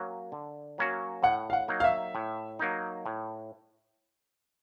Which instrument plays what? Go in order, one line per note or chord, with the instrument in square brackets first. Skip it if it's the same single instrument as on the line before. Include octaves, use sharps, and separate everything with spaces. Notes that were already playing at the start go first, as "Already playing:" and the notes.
Already playing: [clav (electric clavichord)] F#3 A#3 C#4 F#4
D3
F#3 A#3 C#4 F#4
[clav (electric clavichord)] A2 [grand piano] F#5
[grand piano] F5
F#5
[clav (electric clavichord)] F#3 A#3 D#4
[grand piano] F5
E5
[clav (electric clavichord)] A2
F#3 A#3 D#4
A2